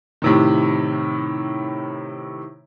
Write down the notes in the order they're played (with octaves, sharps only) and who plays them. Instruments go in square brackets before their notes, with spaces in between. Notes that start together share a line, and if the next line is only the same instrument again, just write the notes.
[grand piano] A2 C3 D#3